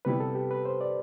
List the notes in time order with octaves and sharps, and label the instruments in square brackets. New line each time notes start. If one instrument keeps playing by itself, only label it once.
[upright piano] C3 G3 B3 E4 [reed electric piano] B4
[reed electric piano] A4
G4
B4
C5
D5